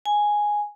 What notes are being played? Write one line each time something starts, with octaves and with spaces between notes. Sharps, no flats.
G#5